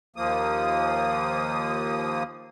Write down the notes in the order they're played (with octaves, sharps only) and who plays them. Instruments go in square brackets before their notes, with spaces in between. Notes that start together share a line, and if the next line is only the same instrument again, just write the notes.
[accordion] D#2 F3 A#3 D#6